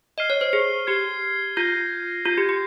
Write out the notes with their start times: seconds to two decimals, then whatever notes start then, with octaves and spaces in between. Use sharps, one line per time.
0.18 D#5 F6 C7 D#7 G7
0.30 C#5
0.41 C5
0.53 G#4
0.87 G4 G#6 C7 G7
1.57 F4 G6 A#6 D#7 G7
2.25 F4 G6 C7 D#7
2.38 G4
2.49 G4